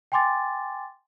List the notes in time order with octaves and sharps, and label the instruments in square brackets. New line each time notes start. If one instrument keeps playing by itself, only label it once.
[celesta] G5 G#5 C6 D6 A6